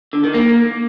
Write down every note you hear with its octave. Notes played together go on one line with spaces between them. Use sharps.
D3
D#3
A#3